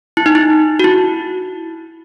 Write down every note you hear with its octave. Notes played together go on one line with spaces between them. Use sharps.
E4
D#4
E4
F#4
E4